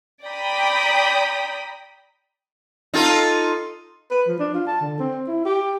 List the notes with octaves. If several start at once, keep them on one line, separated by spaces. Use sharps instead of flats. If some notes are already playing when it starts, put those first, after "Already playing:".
D5 G5 A#5 B5 D#6 B6
D#4 F4 A4
B4
F3
D4
F4
A5
D3
C4
E4
G4